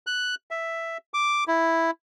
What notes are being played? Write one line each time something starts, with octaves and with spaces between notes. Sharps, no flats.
F#6
E5
D6
E4